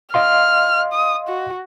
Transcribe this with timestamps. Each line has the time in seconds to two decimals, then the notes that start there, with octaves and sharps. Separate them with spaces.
0.14 D#5 F5 C6 F6
0.93 D#6
1.29 F#4